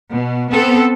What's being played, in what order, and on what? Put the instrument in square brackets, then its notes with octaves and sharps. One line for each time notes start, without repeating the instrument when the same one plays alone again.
[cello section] B2
B3 C4 A4